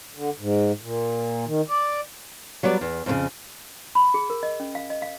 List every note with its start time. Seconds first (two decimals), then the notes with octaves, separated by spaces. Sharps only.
0.15 D3
0.40 G#2
0.82 A#2
1.46 D#3
1.69 D5
2.63 F#3 G3 B3 D5
2.81 E2
3.06 F2 A2 C#3
3.95 B5
4.14 G#4
4.30 A#4
4.43 D#5
4.60 C#4
4.75 F5
4.90 D#5
5.02 F5